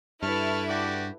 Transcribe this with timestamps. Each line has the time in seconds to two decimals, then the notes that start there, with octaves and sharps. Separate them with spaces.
0.23 G2 E4 A4 B4 A5 C#6 F6
0.69 F#4 G4 D5